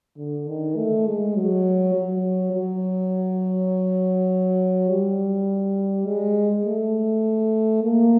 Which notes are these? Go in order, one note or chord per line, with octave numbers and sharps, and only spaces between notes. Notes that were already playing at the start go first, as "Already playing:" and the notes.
D3
D#3
A3
G#3
F#3
F#3
F#3
G3
G#3
A3
A#3